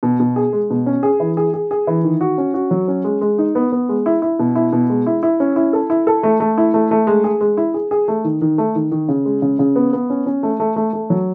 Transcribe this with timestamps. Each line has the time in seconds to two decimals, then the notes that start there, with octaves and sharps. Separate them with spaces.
0.03 B2
0.20 B2
0.36 G#4
0.53 G#3
0.70 B2
0.86 C#4
1.03 G#4
1.20 E3
1.37 G#4
1.54 G#4
1.71 G#4
1.87 E3
2.04 D#3
2.21 F#4
2.38 C#4
2.54 F#4
2.71 F#3
2.88 C#4
3.04 G#3
3.21 G#3
3.38 D#4
3.55 B3
3.72 B3
3.89 G#3
4.06 E4
4.22 E4
4.39 B2
4.55 E4
4.72 B2
4.89 G#3
5.06 E4
5.23 E4
5.40 C#4
5.56 E4
5.73 A4
5.90 E4
6.07 A4
6.23 A3
6.40 A3
6.58 E4
6.74 A3
6.91 A3
7.07 G#3
7.24 G#4
7.41 G#3
7.57 E4
7.74 G#4
7.91 G#4
8.08 A3
8.24 D#3
8.41 D#3
8.58 A3
8.75 D#3
8.91 D#3
9.08 C#3
9.25 G#3
9.42 C#3
9.59 C#3
9.76 B3
9.93 B3
10.10 C#4
10.26 C#4
10.43 A3
10.60 A3
10.76 A3
10.93 A3
11.10 F#3